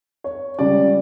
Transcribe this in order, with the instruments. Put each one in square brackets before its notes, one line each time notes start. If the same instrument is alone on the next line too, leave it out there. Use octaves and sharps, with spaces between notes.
[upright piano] C#5
C#2 C#3 G3 D5